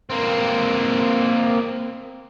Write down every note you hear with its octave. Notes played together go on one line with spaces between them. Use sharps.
A#3 C4